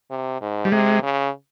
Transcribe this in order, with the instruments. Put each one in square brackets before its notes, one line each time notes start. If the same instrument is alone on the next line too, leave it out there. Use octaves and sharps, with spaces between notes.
[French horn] C3
G#2
[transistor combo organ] G3
[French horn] C3 [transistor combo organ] G#3
[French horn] C#3